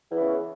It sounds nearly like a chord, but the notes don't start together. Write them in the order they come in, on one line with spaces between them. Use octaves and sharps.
E2 E3 C#3